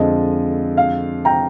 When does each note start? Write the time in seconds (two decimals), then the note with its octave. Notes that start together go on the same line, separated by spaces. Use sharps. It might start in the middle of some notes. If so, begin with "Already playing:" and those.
Already playing: F2 D3 F3 G#3 D#5
0.77 F5
1.25 G5 A#5